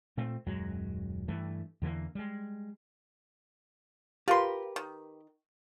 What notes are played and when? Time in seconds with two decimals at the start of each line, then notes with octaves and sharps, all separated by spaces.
0.17 A#2 A3 C4
0.46 D#1 F#2 F#3 G#3
1.28 G2 E3 A3
1.82 E2 D3 E3 A#3
2.15 G3 G#3
4.28 F4 G4 A#4 B4 C6
4.76 D#3